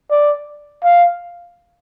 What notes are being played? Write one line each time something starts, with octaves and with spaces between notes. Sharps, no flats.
D5
F5